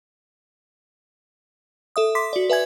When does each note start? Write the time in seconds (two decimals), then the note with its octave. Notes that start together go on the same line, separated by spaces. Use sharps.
1.96 A4 E5 D#6
2.15 C6 D6 B6
2.33 F#4 D5
2.50 B4 E5 G#5 G#6